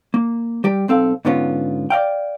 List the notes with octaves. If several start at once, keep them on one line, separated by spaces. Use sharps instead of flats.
A#3
G3 G4
B1 C4 A4 F5
G#2 D3 B3 C#4 F4
D5 D#5 F5 G5